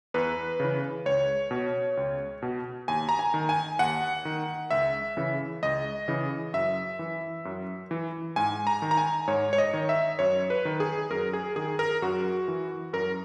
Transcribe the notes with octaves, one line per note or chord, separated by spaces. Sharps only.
E2 B4
C#3 E3
C#2 C#5
B2
C#2
B2
D#2 G#5
A#5
G#5
D#3
G#5
D#2 F#5
D#3
C#2 E5
C#3 E3
C#2 D#5
C#3 E3
F#2 E5
E3
F#2
E3
G#2 G#5
A#5
D#3
A#5
G#5
G#2 C#5
C#5
D#5
D#3
E5
F#2 C#5
B4
D#3
G#4
F#2 A#4
G#4
D#3 G#4
A#4
F#2 F#4
E3
F#2 A#4